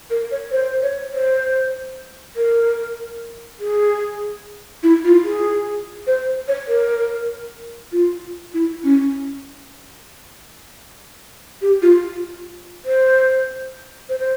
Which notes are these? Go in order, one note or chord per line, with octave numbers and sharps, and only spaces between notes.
A#4
C#5
C5
C#5
C5
A#4
G#4
E4
F4
G#4
C5
C#5
A#4
F4
E4
C#4
G4
F4
C5
C5
C5